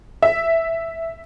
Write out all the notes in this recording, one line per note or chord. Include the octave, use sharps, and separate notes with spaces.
E5